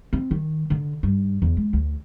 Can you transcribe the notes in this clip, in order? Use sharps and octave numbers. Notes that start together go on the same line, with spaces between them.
C4
D#3
D3
G2
E2
G#3
D2